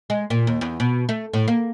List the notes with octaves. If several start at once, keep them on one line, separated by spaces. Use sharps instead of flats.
G#3
A#2
D#2
E2
B2
A3
A2
A#3